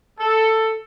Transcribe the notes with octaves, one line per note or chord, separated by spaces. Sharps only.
A4